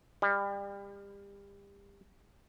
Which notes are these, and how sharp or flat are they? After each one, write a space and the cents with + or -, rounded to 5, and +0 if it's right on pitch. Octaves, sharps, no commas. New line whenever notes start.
G3 +30